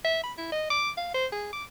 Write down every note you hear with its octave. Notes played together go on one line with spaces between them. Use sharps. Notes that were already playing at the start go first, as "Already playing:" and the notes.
E5
B5
E4
D#5
D6
F5
C5
G#4
D6